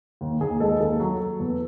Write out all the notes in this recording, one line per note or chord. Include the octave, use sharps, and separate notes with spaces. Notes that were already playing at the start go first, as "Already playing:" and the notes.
D#2
D#2 G#4
G#3 A4
D#2 A4
F#3
F#3
E2